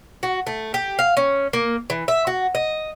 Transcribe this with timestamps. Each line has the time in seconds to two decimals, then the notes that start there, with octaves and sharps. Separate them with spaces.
0.23 F#4
0.47 A3
0.74 G4
0.99 F5
1.17 C#4
1.53 A#3
1.90 E3
2.08 E5
2.27 F#4
2.55 D#5